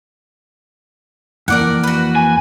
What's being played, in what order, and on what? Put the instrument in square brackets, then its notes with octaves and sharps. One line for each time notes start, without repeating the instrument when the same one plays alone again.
[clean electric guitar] F2 E3 A#3 [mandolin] A#4 D5 F#5
[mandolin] F#4 B4
[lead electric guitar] G#5